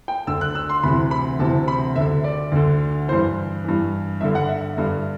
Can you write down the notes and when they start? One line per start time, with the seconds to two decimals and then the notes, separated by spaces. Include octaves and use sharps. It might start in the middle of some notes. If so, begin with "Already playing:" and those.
0.08 G5
0.27 D2 D3 E6
0.41 F#6
0.55 E6
0.69 C6
0.83 D2 C3 E3 B5
1.11 B5
1.39 D2 C3 E3 A5
1.68 B5
1.96 D2 D3 E5
2.24 D5
2.52 D2 D3
3.08 G2 E3 C5
3.65 G2 E3
4.21 G2 D3 E5
4.35 F#5
4.49 E5
4.77 G2 D3 E5